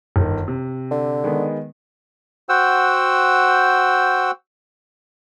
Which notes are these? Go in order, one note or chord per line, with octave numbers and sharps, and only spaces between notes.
G1 D#3
C3
D3
D#3 G#3 B3
F#4 C5 F#5 G5 E6